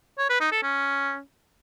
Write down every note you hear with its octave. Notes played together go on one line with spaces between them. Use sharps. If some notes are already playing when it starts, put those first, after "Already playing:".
C#5
B4
D#4
A4
C#4